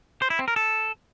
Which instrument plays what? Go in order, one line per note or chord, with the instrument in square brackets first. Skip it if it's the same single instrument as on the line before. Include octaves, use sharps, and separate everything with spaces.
[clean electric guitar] C5
E4
C4
A#4
A4